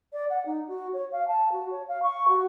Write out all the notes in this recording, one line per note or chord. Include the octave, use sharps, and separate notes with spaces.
D5
F#5
D#4
F#4
C#5
F5
A5
F#4
C#5
F5
C#6
F#4